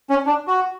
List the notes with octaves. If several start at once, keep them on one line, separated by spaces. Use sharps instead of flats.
C#4
D4
F#4